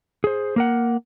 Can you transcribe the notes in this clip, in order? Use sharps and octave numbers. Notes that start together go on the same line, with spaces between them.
G#4 C5
A#3 A#4 F#5